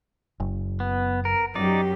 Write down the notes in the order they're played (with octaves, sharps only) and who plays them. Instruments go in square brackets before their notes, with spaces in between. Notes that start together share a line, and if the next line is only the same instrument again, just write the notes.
[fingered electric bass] F#1
[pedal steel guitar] B3
A#4
[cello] F#2 G4 [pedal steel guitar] D#4 D5